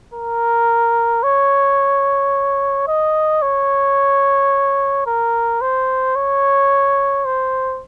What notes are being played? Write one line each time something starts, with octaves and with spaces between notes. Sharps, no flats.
A#4
C#5
D#5
C#5
A#4
C5
C#5
C5